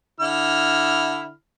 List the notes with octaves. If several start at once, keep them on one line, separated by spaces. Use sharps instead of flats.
D3 E4 F6